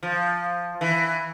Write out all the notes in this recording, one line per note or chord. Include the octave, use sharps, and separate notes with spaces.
F3
E3